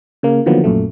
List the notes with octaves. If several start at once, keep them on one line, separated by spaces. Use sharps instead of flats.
C#3 A#3
D3 D#3 F3 F#3 A#3 B3
A#1 F#2 A#2 A3